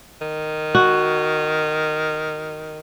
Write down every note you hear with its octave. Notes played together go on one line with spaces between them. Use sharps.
D#3
F#4